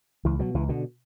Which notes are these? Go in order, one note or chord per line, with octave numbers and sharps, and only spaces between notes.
C#2 E3
B2 F#3
C#2 E3
B2 D3